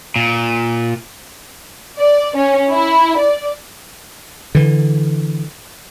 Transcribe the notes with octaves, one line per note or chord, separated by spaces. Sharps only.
A#2
D5
C#4
E4
D5
D3 E3